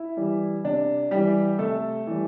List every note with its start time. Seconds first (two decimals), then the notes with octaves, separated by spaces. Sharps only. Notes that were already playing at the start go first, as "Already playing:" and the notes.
Already playing: E4
0.17 E3 G3
0.64 C3 D4
1.11 E3 G3 G4
1.59 C3 A3 A4
2.07 E3 G3